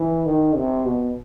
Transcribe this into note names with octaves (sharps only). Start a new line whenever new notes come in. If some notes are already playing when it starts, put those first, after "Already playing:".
Already playing: E3
D#3
C3
B2